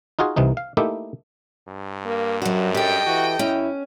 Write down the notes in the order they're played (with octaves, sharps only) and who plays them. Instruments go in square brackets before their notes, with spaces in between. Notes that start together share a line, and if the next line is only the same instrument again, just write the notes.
[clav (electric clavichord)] D#4 F4 F#4 G#4
C2 C3 E3 D#4
F5
A3 A#3 D#4 E4 G4 E5
[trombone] G2
[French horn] A#3
[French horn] F#2 [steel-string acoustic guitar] F#3 F#4
[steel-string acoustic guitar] G4 A4 [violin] D#5 G5
[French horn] E3 [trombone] F#4
[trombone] F#2 [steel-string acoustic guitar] C#4 [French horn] E4